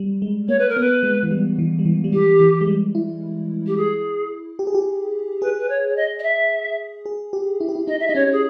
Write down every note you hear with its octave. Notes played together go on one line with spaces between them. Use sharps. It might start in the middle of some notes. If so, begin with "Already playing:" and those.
Already playing: G3
G#3
A#3 C#5
B4
A#4
B3 B4
G#3
E3
G3
E3
G3
E3
G3
E3 G4
E3
G#3
G3
E4
G4
G#4
G4
G#4
G4
G#4 B4
B4
C#5
C#5
D#5
D#5
E5
G#4
G4
E4
G4
E4
D#4 D#5
E5
D#4 D#5
C#4 C#5
G#4